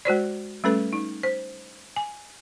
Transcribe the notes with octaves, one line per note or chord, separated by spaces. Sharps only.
G#3 F#4 C5 D5
G3 A3 C#4 A4 B4
D#4
C5
G#5